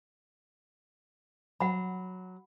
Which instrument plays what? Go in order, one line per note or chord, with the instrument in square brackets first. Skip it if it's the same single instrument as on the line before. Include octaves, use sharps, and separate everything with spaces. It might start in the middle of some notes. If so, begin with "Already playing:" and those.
[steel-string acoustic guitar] F#3 [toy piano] F#5 B5